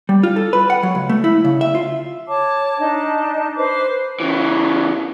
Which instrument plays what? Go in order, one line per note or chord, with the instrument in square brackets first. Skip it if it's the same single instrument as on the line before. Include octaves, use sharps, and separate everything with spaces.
[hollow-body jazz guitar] G3
F4
A4
B4
F#5
F#3
C#2
A3
E4
C#3
E5
F4
[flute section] C#5 A5 D6
D4 D#4 D#5 A5
B4 C5 D6
[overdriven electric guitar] C#3 E3